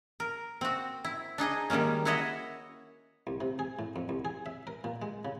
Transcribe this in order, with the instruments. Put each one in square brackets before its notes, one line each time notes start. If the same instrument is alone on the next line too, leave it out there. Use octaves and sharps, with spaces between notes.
[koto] A#4
C4 F#4
E4
D4 D#4 G#4 D#5
D#3 G3 G#3 A#3 C#4
E4 F#4 C#5 D#5 E5 F#5
[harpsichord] C2
C3
G#4
A2
F2
C2
G#4
E5
A#4
A#2
G#3
C#3